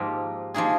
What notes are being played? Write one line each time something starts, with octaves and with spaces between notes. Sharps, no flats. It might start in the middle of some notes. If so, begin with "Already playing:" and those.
Already playing: G#2 F3 A#3 D#4 G4
F3 A#3 D#4 G#4